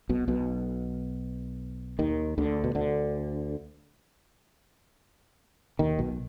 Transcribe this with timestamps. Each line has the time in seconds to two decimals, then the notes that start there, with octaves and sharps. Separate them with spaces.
0.09 B1 B2
0.28 B1 B2
1.99 D#2 D#3
2.38 D2 D3
2.64 B2
2.75 D2 D3
5.79 D#2 D#3
5.99 B1 B2